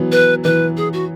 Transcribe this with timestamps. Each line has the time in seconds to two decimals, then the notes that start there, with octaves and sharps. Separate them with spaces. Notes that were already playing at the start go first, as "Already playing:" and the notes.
Already playing: E3 F#3 B3
0.12 B4
0.44 E3 B4
0.77 G#4
0.93 F#4